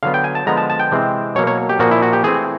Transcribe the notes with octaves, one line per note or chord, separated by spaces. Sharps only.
D3 F#3 B3 F5
G5
G#5
A5
D3 F3 G#3 B3 A#5
A5
A5
G5
C3 E3 G#3 C4
B2 F#3 A#3 C#5
C#5
G4
A#2 F3 A#3 F#4
E4
F#4
G4
E3 A3 C4 G#4